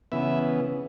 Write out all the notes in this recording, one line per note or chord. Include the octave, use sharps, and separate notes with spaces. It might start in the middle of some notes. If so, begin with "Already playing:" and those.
C#3 E3 B3 E5